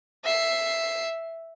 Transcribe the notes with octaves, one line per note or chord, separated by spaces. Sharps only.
E5 C7